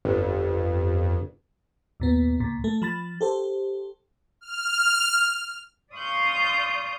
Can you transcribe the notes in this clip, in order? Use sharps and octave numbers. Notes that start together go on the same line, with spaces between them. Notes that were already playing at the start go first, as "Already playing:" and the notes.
G1 F2
D#2 A#2 B3
C#2 A#2
A3 A4
F3 B5 A6
G4 A4 C5
F6
D5 F5 C6 C#6 D#6 G6